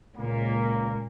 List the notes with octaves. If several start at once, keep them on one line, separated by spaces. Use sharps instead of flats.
C#2 A#2 A#3